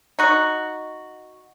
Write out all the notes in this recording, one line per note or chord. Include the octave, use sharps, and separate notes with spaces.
D#4 F#4